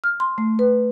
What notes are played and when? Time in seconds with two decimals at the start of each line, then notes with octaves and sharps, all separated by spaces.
0.04 F6
0.20 C6
0.38 A3
0.59 B4